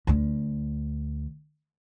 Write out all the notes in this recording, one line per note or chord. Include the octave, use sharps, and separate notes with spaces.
D2 D3